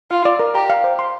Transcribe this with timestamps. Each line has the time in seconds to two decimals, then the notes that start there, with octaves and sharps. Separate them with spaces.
0.11 F4 F5
0.25 D5
0.40 A#4
0.55 G4 A#5
0.70 F5
0.84 C5
0.99 C6